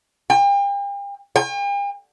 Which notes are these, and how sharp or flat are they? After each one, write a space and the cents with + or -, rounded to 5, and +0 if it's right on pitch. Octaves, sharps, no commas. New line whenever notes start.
G5 +40
G5 +45